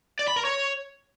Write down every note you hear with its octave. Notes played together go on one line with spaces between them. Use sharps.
D5
B5
A#4
C#5